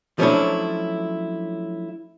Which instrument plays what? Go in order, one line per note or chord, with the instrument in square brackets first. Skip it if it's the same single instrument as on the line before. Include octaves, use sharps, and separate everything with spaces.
[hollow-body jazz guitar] F3 F#3 A3 C#4 D4 E4